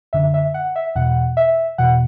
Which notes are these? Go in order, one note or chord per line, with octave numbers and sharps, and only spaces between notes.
F#2 D3 E5
E5
F#5
E5
E2 B2 F#5
E5
E2 B2 F#5